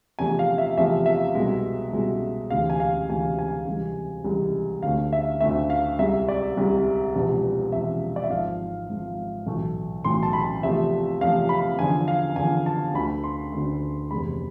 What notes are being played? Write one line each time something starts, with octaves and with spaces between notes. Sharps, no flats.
E2 C3 F3 A3 G#5
F5
E5
E2 C3 F3 A3 E5
E5
C2 B2 G#3
C2 B2 G#3
D2 C3 E3 G#3 F5
G#5
F5
D2 C3 E3 G#3 G#5
G#5
C2 C3 E3 G#3
C2 C3 E3 G#3
D2 D3 A3 F5
E5
D2 D3 A3 E5
F5
C2 C3 G#3 E5
D5
C2 C3 G#3
E1 E2 C3 F3
E1 E2 C3 F3 E5
D5
E5
G#1 G#2 F3 F5
G#1 G#2 F3
B1 A2 E3 A3
B1 A2 E3 A3 C6
A5
B5
E2 C3 F3 A3 E5
E2 C3 F3 A3 F5
B5
E2 D3 F3 G#5
F5
E2 D3 F3 G#5
A5
D2 D3 A3 B5
C6
D2 D3 A3
F1 E2 C3 G#3 B5